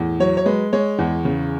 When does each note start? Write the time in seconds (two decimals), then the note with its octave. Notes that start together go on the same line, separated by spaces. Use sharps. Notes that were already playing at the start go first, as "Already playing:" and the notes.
Already playing: E2 A2
0.20 F#3 C#5
0.37 C#5
0.46 G#3 B4
0.73 G#3 C#5
0.99 E2
1.25 C#3